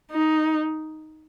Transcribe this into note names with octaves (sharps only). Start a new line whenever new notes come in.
D#4